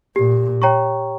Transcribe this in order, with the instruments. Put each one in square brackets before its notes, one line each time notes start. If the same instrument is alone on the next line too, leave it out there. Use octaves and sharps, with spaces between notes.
[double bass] A#2 [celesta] G4
[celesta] C#5 G5 A#5 C#6